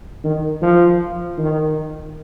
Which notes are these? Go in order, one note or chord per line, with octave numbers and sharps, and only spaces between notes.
D#3
F3
D#3